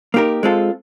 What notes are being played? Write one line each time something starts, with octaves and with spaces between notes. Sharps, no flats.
A#3 D#4 G4 A#4
G#3 C4 F4 A4